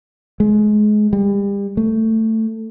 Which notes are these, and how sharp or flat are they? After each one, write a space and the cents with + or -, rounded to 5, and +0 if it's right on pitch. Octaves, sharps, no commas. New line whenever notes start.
G#3 +25
G3 +35
A3 +15